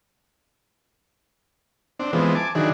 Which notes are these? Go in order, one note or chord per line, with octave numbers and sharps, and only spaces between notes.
C4 D4
E3 F3 G#3 B3 C4
G#5 A5 D6
D3 D#3 F#3 D4 E4 G#4